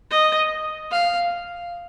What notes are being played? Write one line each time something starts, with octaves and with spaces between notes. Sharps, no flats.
D#5
F5